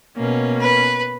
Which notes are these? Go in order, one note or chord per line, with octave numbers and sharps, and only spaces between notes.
B2 A#3 C#4
B4